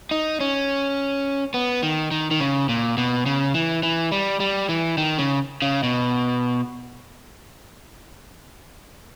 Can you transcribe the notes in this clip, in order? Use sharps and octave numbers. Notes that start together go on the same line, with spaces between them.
D#4
C#4
B3
D#3
D#3
D#3
C#3
A#2
B2
C#3
E3
E3
G3
G3
E3
D#3
C#3
C#3
B2